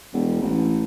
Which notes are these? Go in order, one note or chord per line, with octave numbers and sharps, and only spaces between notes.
E1
A1